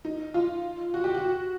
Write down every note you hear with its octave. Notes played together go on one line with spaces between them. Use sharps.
D#4
F4
F#4
G4
F#4